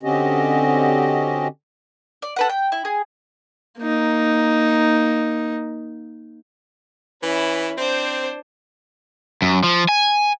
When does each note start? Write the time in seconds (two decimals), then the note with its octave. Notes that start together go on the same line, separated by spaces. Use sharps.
0.03 D3 C4 C#4 F#4 G4 D#5
2.22 D5
2.36 A4 B4 F#5
2.49 G5
2.72 E4
2.85 G#4
3.80 A#3 D#4
7.23 E3 C#4 E4
7.78 C4 D4 C5
9.42 F#2
9.64 F3
9.89 G#5